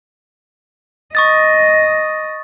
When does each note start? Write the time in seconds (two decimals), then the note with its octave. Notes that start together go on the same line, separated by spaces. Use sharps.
1.15 D#5 C#6 D#6 A6